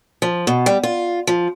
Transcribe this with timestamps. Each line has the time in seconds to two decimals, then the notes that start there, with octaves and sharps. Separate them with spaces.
0.22 F3
0.47 B2
0.66 G3
0.83 F4
1.27 F3